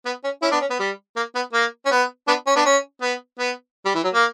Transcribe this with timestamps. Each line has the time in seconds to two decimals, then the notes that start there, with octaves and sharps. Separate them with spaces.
0.06 B3
0.24 C#4
0.42 C#4 E4
0.51 B3 D4
0.61 C#4
0.70 B3
0.79 G3
1.16 A#3
1.35 B3
1.53 A#3
1.85 C#4
1.91 B3
2.28 B3 D4
2.47 C#4
2.56 B3 D4
2.65 C#4
3.02 B3
3.39 B3
3.85 G3
3.95 E3
4.04 F#3
4.14 A#3